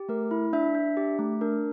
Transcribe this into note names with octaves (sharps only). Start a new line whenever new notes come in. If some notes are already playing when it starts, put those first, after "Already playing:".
Already playing: G4
A3 A#4
E4
D4 E5
D4
G4
A3
D4 A#4